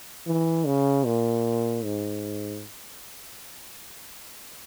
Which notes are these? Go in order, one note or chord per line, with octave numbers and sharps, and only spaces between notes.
E3
C#3
A#2
G#2